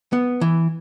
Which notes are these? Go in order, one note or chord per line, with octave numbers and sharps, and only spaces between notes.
B3
E3